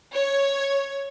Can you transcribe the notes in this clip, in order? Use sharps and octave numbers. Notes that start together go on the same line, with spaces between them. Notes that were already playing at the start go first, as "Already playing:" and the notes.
C#5